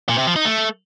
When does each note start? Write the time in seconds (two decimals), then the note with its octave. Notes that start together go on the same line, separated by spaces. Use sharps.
0.09 A#2
0.18 C3
0.27 F3
0.36 D#4
0.45 A3